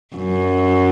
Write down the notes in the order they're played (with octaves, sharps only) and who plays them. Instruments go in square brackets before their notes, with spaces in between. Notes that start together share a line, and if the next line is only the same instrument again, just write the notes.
[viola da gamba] F#2